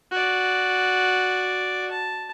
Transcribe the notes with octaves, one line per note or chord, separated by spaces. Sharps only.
F#4 D5
A5